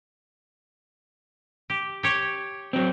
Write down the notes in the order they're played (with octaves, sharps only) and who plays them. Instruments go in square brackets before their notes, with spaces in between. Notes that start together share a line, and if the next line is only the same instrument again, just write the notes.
[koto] G4
G4 C#5
[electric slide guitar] F#3 C4